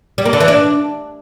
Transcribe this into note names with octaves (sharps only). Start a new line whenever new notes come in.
G3
A#3
D3
E3
D4